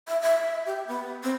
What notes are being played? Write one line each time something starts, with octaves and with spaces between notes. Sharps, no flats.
E5
E5
G4
B3
C4